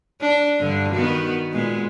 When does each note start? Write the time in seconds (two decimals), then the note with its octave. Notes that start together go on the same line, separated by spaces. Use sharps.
0.21 D4
0.60 G2 D3 D4
0.92 D#3 B3 F#4
1.51 A#2 G#3 B3